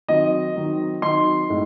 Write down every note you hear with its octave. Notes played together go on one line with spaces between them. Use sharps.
D#3 F#3 C4 D#4 D#5
D#3 F#3 C4 D#4
D#3 F#3 C4 D#4 C6
A2 G#3 D#4